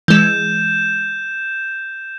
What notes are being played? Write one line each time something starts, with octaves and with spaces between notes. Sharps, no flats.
E3 G#3 G6 E7